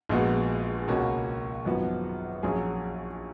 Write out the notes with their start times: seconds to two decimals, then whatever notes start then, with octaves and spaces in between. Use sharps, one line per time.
0.09 A#1 A#2 G#3 B3 F#4
0.88 C#2 B2 A#3 C#4 F#4
1.65 G#1 F#2 F3 B3 F#4
2.43 A#1 A#2 F#3 C#4 G#4